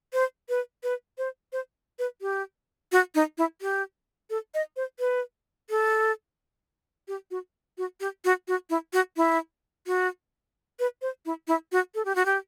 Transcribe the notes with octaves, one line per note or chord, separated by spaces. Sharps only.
C5
B4
B4
C5
C5
B4
G4
F#4
D#4
E4
G4
A4
D#5
C5
B4
A4
G4
F#4
F#4
G4
F#4
F#4
E4
F#4
E4
F#4
B4
C5
E4
E4
F#4
A4
G4
F#4
G4